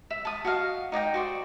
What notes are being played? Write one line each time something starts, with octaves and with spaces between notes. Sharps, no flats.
E5
A5 D#6
F#4 D#5 F5
D#4 D5 D#5 G5
F#4 C5 D5